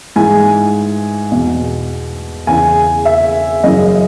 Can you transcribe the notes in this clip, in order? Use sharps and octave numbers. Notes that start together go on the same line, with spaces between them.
G#2 E3 G#5
E2 B2
E2 C#3 E3 G#5
E5
F#2 C#3 E3 D#5